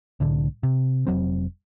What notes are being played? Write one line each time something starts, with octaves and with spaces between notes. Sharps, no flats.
C2 A2 D3
C3
F1 F2 F#3 C4